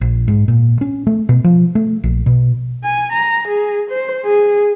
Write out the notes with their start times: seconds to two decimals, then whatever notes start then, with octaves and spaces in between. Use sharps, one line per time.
0.01 A#1
0.28 G#2
0.48 A#2
0.81 C#4
1.07 A3
1.29 B2
1.44 F3
1.75 A3
2.04 A#1
2.26 B2
2.84 G#5
3.13 A#5
3.48 G#4
3.91 C5
4.26 G#4